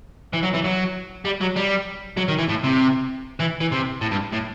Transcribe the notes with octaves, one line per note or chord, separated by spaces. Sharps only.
E3
F#3
E3
F#3
G3
F#3
G3
F#3
D#3
E3
A2
C3
E3
E3
C3
A2
G2
A2